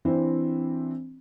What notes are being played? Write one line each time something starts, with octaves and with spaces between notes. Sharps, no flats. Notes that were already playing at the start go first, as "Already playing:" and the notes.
E3 C4 D4 E4 C5